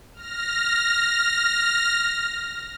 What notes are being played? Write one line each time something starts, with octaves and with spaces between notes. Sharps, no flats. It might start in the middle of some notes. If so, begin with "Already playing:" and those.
F6 A#6